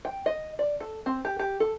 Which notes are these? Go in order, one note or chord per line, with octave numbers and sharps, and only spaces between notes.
G5
D#5
D5
A4
C4
G4
G4
A4